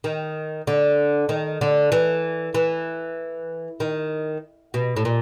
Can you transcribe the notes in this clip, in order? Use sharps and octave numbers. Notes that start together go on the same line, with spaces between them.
D#3
D3
D#3
D3
E3
E3
D#3
B2
A2
A#2